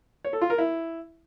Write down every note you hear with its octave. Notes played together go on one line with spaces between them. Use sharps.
C#5
A4
F4
A#4
E4